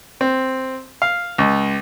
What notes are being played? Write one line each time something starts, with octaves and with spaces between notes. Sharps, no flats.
C4
F5
C#2